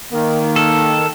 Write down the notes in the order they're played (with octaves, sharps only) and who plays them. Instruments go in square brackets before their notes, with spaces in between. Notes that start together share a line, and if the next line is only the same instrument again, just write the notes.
[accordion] D#3 [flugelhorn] A#3
[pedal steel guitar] A4